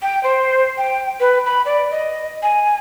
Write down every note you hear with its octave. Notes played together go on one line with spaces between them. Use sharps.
G5
C5
G5
B4
B5
D5
D#5
G#5